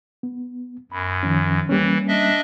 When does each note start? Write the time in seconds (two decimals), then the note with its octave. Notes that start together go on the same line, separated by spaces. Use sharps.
0.23 B3
0.92 F#2 B5
1.23 D#3 F3 C#4
1.69 E3 G3 A#3 C#4
2.08 D4 D#5 E5